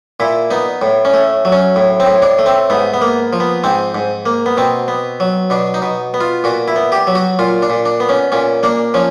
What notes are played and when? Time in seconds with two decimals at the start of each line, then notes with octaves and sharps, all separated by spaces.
0.20 A#2 E4
0.50 B3 D#4
0.82 A2
1.05 C#4
1.14 A3
1.45 F#3
1.52 C#4
1.76 A2
2.00 C4
2.06 A2
2.22 D4
2.39 A3
2.46 C4
2.70 G#2 B3
2.94 B3
3.01 A#3
3.33 F3
3.40 B3
3.64 G#2 C4
3.95 G#2
4.26 A#3
4.46 B3
4.57 B2 C4
4.88 B3
5.20 F#3
5.50 B2 D4
5.74 D#4
5.82 B2
6.14 B3
6.21 F4
6.44 A#2 F#4
6.68 E4
6.76 B3
6.92 G4
7.07 F#3
7.15 F#4
7.39 A#2 F4
7.62 D4
7.70 A#2
7.85 D4
8.00 B3
8.09 C#4
8.32 A#2 C#4
8.63 A#3 D4
8.94 F3 C#4